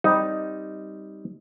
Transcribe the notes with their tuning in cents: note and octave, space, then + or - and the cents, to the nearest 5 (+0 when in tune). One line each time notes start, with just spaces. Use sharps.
G3 +0 C4 +0 D#4 +5